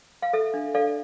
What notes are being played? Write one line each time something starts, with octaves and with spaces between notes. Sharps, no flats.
F5
A4 E5
D4
A4 D5 F5